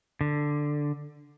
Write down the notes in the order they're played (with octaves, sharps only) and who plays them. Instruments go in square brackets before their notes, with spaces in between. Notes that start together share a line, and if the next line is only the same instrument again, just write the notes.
[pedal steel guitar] D3